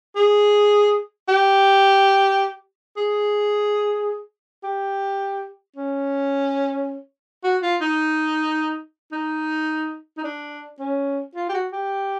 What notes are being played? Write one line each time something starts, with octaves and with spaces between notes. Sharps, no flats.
G#4
G4
G#4
G4
C#4
F#4
F4
D#4
D#4
D#4
D4
C#4
F4
G4
F#4
G4